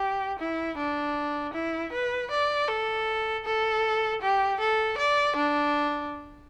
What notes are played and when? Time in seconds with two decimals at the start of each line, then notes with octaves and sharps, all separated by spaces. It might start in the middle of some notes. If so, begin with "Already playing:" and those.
Already playing: G4
0.39 E4
0.78 D4
1.54 E4
1.93 B4
2.31 D5
2.68 A4
3.45 A4
4.21 G4
4.60 A4
4.98 D5
5.36 D4